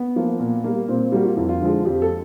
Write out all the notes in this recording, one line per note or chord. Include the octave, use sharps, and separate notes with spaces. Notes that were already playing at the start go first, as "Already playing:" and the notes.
Already playing: B3
F3 A#3
A#2
G3 A#3
A#2 C4
G3 A#3 F#4
F4
F2 E4
F4
D3 F3 G#3
F2 G4
A4